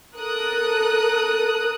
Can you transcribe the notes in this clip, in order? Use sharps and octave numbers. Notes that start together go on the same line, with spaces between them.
A4 A#4 D#6 F#6